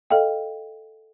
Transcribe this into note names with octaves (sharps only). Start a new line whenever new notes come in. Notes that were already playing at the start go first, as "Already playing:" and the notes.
A4 D#5 F5 G5